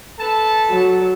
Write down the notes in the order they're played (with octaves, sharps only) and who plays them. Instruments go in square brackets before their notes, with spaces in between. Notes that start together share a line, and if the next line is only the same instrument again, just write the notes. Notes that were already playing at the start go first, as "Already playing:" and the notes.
[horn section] A4 B4 A5
[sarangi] F#3